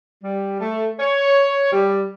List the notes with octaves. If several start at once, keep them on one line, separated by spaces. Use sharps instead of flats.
G3
A3
C#5
G3